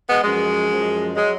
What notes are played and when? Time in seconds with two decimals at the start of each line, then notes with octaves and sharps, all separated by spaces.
0.08 G#3 B3
0.23 F#2 F3 G#3
0.69 F#2 F3
1.16 F#3 G#3